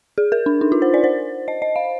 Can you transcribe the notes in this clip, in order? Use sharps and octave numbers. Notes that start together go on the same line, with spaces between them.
G#4
A#4
D4
D#4
F4
C5
D5
C5
D#5
D#5
F5